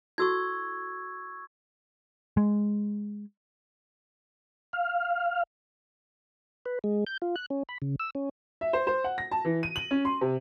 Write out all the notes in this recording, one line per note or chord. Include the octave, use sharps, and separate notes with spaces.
E4 F#4 A4 C#6 E6 G#6
G#3
F5
B4
G#3
G6
F4
F#6
C#4
B5
C#3
E6
C#4
E5
C5
C5
F#5
A#6
A5
E3
D#7
F#7
C#4
C6
C3